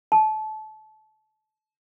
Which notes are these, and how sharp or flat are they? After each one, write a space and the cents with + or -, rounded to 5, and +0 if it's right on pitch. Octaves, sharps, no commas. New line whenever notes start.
A5 -25